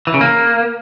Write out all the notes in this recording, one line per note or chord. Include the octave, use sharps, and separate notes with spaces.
E3
C#3
A#3